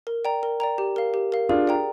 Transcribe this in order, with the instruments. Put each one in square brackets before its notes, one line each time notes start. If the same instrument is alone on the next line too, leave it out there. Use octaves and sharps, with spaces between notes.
[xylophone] A#4
D5 G5 A#5
A#4
D5 G5 A#5
G4
A#4 F5
G4
A#4 F5
[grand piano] D4 F4 [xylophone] G#4
[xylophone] D5 G5 A#5